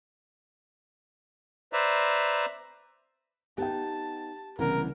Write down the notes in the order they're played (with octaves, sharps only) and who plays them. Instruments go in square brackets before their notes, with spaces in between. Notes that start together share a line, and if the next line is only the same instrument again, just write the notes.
[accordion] B4 C5 D5 E5 A#5
[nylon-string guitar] B3 D#4 [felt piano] G4 G5 [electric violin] A5
[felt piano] C2 C#3 [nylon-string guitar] E3 B3 [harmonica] A#4